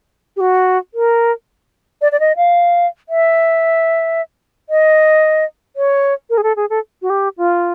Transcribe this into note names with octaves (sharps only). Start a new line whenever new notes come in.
G4
F#4
A#4
D5
D5
D#5
F5
E5
D#5
C#5
A#4
G#4
A4
G#4
A4
F#4
G4
F4